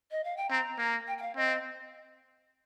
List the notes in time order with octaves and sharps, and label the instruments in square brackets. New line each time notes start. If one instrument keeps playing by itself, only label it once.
[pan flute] D#5
F5
G5
[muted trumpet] C4 [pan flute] A#5
[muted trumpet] A#3
[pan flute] G5
G5
F5
[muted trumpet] C4 [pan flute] D#5